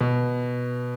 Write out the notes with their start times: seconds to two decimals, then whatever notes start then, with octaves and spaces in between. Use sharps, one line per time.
0.01 B2